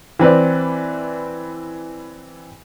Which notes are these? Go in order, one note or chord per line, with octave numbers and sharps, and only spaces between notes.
E3 C4 B4 D5